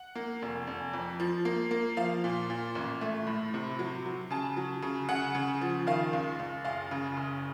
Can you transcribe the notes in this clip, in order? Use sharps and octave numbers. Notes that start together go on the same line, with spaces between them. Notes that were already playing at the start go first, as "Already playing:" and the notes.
Already playing: F#5
A#3
F1
F1
F2
F3
A#3
A#3
F3 F5
A#2
A#2
A1
A3
A2
C3
F#3
F#3
C#3 A5
F#3
C#3
C#3 F#5
C#3
F3
D#3 F5
C#2
C#2
F#1 F5
C#3
F#1